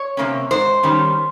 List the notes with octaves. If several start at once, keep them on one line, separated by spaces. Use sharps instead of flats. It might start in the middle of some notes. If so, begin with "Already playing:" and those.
Already playing: C#5
C3 D#3 A#3 C#4
G#2 C5
D#3 G3 C#4